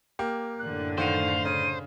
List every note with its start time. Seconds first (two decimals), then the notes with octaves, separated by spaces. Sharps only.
0.19 A#3 G4
0.59 F#2 A2 D3 F#6
0.98 D#3 C5 F5 F#5 D#7
1.45 C#3 D#7